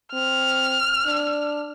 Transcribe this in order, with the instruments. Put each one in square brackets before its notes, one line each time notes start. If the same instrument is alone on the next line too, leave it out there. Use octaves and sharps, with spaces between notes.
[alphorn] C4 [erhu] F6
[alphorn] D4